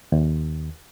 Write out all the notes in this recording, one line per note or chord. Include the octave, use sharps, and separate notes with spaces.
D#2